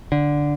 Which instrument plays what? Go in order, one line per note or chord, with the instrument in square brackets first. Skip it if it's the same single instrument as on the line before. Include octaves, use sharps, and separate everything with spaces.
[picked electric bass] D3